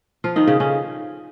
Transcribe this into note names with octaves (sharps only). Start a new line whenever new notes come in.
F3 F4
D#3 D#4
C#3 C#4
C#3 C#4